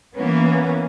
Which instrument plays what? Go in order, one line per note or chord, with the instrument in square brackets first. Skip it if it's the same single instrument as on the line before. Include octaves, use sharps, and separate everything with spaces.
[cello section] E3 A#3 B3 C#4